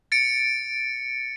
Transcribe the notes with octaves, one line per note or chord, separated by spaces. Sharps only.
A6 C#7 D7